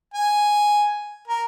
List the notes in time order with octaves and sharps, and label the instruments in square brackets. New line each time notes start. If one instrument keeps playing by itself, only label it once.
[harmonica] G#5
A#4